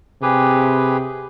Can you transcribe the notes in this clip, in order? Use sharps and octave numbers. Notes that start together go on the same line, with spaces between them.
C3 G4 G#4 B4